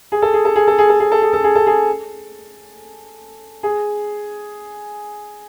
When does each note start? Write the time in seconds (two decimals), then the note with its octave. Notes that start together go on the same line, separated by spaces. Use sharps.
0.12 G#4
0.22 A4
0.34 G#4
0.45 A4
0.56 G#4
0.67 A4
0.79 G#4
0.89 A4
1.00 G#4
1.12 A4
1.22 G#4
1.33 A4
1.44 G#4
1.55 A4
1.67 G#4
3.63 G#4